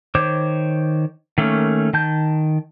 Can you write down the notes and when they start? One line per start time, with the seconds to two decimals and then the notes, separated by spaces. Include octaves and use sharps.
0.15 D#3 C5 C#5 D6
1.38 D#3 A3 A#3 C#4
1.93 D#3 A5 G6